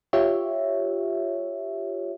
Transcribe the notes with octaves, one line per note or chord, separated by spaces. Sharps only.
F4 G4 C#5 E5